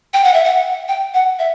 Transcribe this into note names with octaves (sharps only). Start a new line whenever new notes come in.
G5
F#5
E5
F#5
G5
F#5
E5